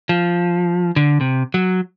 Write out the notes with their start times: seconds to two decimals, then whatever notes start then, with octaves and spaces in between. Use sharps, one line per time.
0.09 F3
0.96 D3
1.21 C3
1.54 F#3